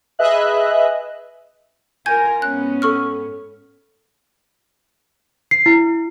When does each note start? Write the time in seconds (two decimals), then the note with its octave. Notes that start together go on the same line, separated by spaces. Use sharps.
0.19 G#4 B4 D#5 E5 F#6
2.06 F4 A#4 G#5 G6 G#6
2.42 G#2 B3 C#4 F#6
2.82 A4 C#6 F6
5.51 C7
5.66 E4